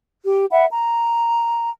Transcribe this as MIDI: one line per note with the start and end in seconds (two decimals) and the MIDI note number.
0.23 0.46 67
0.51 0.65 76
0.51 0.65 78
0.51 0.65 83
0.71 1.71 82